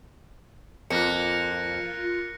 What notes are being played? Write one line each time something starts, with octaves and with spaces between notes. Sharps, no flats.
F2 A#3 F4 F#6 A#6 C#7